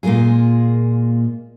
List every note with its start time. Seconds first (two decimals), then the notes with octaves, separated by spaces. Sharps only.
0.03 A#2 G#3 A#3 F4 G#4